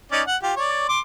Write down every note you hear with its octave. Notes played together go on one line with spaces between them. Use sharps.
C#4 D#4 D5
F#5
F4 G4
C#5 D5
C6 D6